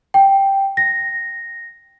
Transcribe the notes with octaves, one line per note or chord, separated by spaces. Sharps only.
G5
A#6